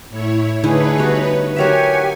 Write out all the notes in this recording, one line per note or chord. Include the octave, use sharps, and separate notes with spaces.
A2 E4 C#5
D3 A3 D#4 E4 G#4 B4 C#5
G3 B3 F#4
F#3 G4 A#4 C#5 E5 F#5 G#5